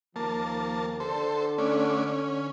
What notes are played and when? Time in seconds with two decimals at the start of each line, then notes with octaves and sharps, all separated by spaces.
0.16 D#2 F3 A#3 A5
1.00 D3 A4 C5
1.58 A3 C#4 D4
2.07 C#4